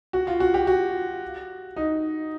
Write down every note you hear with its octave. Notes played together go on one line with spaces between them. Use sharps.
F#4
F4
F#4
G4
F#4
D#4